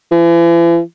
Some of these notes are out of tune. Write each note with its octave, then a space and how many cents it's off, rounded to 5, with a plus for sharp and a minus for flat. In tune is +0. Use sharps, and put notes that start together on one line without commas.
E3 +40